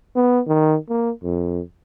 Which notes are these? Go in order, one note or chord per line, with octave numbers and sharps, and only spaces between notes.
B3
D#3
A#3
F2